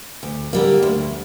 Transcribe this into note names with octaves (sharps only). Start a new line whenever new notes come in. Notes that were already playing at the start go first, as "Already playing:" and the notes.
D2
D3 G3 A#3
D2